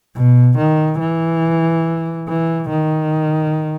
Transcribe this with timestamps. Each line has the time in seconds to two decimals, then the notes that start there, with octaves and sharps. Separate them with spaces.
0.15 B2
0.58 D#3
0.99 E3
2.28 E3
2.69 D#3